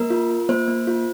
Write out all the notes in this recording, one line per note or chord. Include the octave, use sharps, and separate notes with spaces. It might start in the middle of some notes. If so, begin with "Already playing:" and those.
Already playing: A#3 A#4
F4
F4
A#3 C5
A#3
F4